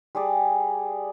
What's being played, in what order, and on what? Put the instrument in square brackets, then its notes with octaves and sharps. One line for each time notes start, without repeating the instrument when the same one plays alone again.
[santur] G3 G#4 D5